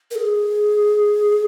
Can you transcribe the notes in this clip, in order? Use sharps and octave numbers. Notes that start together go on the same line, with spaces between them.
A#4
G#4